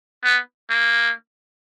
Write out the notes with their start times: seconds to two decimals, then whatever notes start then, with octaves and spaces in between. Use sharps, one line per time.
0.24 B3
0.70 A#3